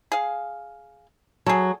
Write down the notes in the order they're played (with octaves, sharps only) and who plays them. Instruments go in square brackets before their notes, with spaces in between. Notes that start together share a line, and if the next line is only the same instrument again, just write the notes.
[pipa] G#4 F5
[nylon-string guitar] F#3 [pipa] G#4 A4